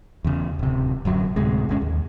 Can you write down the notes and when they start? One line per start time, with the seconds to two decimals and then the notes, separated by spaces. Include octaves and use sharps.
0.25 E2 C#3
0.59 D1 C3
1.05 D1 F#2 F#3
1.36 D2 A2 C3 G#3
1.69 G1 G#3 C#4
1.82 D#2